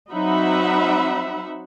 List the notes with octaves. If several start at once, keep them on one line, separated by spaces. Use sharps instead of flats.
F#3 C4 D#4 E5 F#5 B5